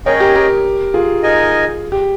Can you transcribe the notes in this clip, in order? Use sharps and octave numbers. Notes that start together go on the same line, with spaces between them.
C#4 G#4 A#4 C#5 D#5 G5
G4 A#4
G4 A#4
F4 G#4
D#4 A#4 D#5 G#5
G4